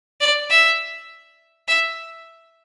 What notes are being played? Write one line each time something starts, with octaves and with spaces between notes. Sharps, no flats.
D5
E5
E5